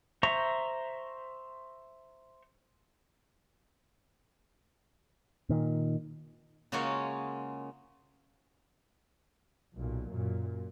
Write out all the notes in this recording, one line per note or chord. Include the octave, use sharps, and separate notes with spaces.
C5 E5 A#5 C#6
A#2 D#3
C#3 G#3 A#3 F4 F#4 C#5
B1 A#2
F#2 A#2